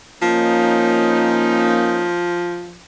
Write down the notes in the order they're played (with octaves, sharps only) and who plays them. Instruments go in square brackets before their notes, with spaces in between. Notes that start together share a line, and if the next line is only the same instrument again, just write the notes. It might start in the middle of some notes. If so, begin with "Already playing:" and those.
[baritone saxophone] F3 [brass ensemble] A#3 C#4 D#4